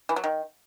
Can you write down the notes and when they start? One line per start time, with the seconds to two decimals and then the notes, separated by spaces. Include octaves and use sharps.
0.09 E3
0.16 F#3
0.24 D#3